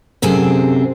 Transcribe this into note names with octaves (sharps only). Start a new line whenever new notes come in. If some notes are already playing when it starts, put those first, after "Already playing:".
F#2 C3 C4 G#4 A4